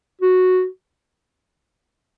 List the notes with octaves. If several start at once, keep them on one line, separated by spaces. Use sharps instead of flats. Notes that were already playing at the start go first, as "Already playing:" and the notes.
F#4